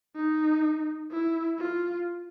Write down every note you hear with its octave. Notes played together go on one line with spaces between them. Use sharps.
D#4
E4
F4